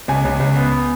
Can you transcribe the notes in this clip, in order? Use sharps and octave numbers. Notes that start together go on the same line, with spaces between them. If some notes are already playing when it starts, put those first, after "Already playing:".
C#2 G#5
C#2
C#2
B3